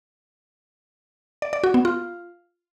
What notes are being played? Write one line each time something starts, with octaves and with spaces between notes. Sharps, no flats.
D5
D5
F#4
B3
F4